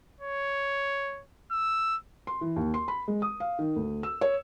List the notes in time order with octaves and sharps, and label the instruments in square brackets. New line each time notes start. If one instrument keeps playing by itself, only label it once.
[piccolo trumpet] C#5
E6
[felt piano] C6
E3
D#2
C6
B5
G#3
D#6
F5
D#3
D2
E6
C#5